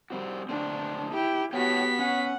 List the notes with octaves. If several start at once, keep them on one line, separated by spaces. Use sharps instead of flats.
G3 C4 F#4
D3 A3 C4 D4
E4 G4 G5
A3 B3 F#4 G4 C#5 G5 B6
C#4 F#5